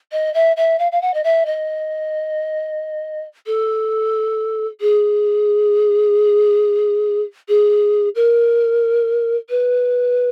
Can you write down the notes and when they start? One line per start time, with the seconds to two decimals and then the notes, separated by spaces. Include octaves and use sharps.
0.12 D#5
0.34 E5
0.56 E5
0.79 F5
0.92 F5
1.01 F#5
1.14 D#5
1.23 E5
1.46 D#5
3.46 A4
4.80 G#4
7.48 G#4
8.15 A#4
9.49 B4